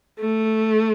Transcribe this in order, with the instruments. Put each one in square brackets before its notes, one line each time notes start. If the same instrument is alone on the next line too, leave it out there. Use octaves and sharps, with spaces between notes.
[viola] A3